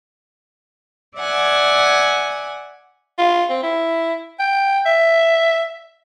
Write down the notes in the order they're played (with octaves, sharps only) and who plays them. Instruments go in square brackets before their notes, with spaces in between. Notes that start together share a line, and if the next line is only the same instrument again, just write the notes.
[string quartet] D5 E5 F#5 G#5
[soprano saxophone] F4
C4
E4
G5
E5